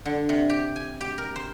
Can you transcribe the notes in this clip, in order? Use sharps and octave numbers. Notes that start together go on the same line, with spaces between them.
D3
C3
G4
G#5
G4
A#4
C5